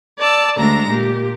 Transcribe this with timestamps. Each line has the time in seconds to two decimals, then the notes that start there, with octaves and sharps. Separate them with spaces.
0.19 D5 A5 E6
0.58 D2 G#3 D4 A#5 A#6
0.90 A#2 G4